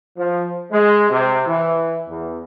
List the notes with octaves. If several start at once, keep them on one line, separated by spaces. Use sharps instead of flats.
F3
G#3
C3
E3
E2